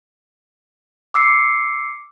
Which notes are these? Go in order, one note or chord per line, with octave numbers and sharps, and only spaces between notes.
D6 E6 C7 C#7